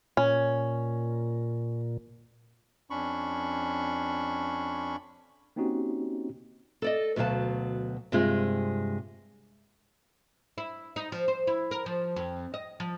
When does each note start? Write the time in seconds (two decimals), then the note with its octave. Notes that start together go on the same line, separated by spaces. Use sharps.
0.17 A#2 C#4
2.90 F2 C#4 D4 B5 C#6
5.56 A#3 C4 C#4 D#4 F#4 G4
6.82 A4 D5 D#5
7.16 D2 B2 F#3 F5 A5
8.12 G2 C3 G#3 C4 F4 G#4
10.58 E4
10.96 D#4
11.12 F3
11.28 C5
11.47 E4
11.71 A#4
11.86 F3
12.16 F2
12.54 D#5
12.80 F3